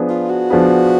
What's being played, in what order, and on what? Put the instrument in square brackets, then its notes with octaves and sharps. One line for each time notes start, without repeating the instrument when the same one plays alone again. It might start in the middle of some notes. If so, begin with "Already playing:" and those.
Already playing: [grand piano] F3 B3 D4 G#4 B4
[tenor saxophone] F4
F#4
[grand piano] F3 B3 D4 G#4 B4